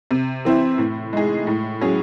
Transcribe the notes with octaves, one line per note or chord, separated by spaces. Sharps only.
C3
E3 C4 E4
A2
G#3 D#4 G#4
A2
F#3 C#4 G#4